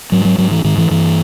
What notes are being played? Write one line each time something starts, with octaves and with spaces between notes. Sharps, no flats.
G#2 F#3
F#3
G#2 F#3
E3
G#2 D#3
E3
G2 E3